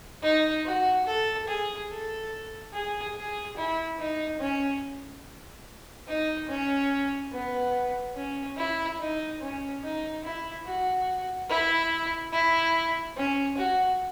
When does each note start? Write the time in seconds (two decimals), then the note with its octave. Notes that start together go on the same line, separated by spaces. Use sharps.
0.22 D#4
0.65 F#4
1.06 A4
1.48 G#4
1.90 A4
2.73 G#4
3.15 G#4
3.57 E4
3.99 D#4
4.40 C#4
6.08 D#4
6.49 C#4
7.32 B3
8.15 C#4
8.57 E4
9.00 D#4
9.41 C#4
9.83 D#4
10.24 E4
10.66 F#4
11.49 E4
12.32 E4
13.17 C#4
13.57 F#4